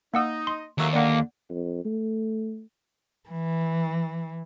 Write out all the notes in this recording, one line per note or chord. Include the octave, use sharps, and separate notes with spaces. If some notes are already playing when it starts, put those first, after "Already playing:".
A#3 D#4 D#5 F#5 E6
C6
D#2 F#3 A3 A#3
D3 A#3 D5 F#5
F2
A3
E3